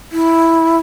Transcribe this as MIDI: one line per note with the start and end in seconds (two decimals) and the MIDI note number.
0.12 0.78 64